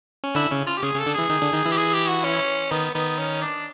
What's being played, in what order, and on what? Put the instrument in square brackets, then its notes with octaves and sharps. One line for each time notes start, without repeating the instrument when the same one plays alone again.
[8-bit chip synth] C#4
[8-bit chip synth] D3 D4 [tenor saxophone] E4
[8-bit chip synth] C#3 C#4
[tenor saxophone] F4
G4
[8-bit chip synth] C#3 C#4 [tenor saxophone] G#4
[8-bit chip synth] C#3 C#4
[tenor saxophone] A4
[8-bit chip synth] D3 D4
[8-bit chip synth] E3 E4 [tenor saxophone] G#4
[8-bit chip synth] D#3 D#4
D3 D4
D#3 D#4
E3 E4
[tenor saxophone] G4
G#4
G4
F#4
C#4
[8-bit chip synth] D#3 D#4 [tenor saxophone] B3
[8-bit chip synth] D#3 D#4 [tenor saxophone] B3
[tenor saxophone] C#4
D4